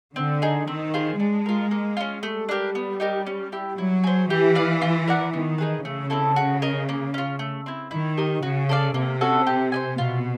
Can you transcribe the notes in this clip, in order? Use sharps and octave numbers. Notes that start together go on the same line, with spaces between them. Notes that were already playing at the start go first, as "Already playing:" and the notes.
D3 C4
D#4 G#4
D#3 C4
F4 G#4 C5
G#3 D4
F4 A#4
A#3
C#4 F4
G3 A3
D4 G4 A#4
B3
D#4 G4 A#4
C#4
E4 G4
F#3 E4
G#4 C5
E3 G4
B4 D5 F5
F4
A#4 D5 F#5
D#3 B3
D#4 G#4 B4
C#3 A3
C4 E4 A4
F#4
A#4 D#5
A#3
C#4 F4
A3
C4 E4
D#3 E4
G4 A#4 D#5
C#3 F#4
A4 D5 F5
C3 A#3
C#4 F#4 A4
G4
C5 D#5 G#5
B2 F4